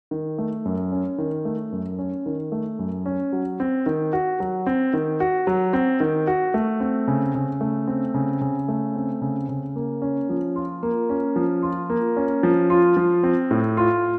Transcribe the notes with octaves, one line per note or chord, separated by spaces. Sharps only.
D#3
A3
F#2
C#4
D#3
A3
F#2
C#4
D#3
A3
F#2
C#4
F#3
C4
D#3
F#4
F#3
C4
D#3
F#4
F#3
C4
D#3
F#4
A3
C4
C#3
C#3
A3
C4
C#3
C#3
A3
C4
C#3
C#3
A#3
C#4
F3
F4
A#3
C#4
F3
F4
A#3
C#4
F3
F4
F3
C4
A2
F4